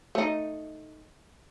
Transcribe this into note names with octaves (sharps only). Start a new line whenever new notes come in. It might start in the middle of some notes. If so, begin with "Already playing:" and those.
A3 D#4